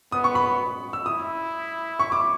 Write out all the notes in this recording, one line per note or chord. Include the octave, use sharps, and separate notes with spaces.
B3 D#6
C#6
B5
E6
E4 D#6
C#6
D6